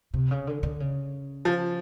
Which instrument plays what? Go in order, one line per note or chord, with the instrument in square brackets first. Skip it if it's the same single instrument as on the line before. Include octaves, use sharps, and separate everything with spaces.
[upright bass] C3
C#3
D3
D3
C#3
[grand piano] F3